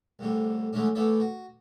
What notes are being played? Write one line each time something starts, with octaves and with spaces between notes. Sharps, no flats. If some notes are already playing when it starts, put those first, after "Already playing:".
C2 F2 A2 D3 G3
E3 F#3 G#3 A3 C#4 D4
E3 A3 B3 A4 C#5 D5
F#4